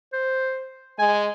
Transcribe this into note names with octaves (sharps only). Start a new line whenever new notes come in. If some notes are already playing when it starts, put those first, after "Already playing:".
C5
G#3 G#5